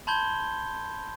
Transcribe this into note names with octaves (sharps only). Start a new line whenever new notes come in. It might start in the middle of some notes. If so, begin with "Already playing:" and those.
A5 B5 C6 G6 G#6 G7